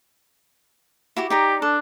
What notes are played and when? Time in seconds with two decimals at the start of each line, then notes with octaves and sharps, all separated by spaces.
1.16 E4 F#4 G4
1.30 D#4 G4 D5 A#5
1.62 D4 A4